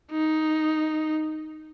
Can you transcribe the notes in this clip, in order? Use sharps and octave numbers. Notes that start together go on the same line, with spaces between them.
D#4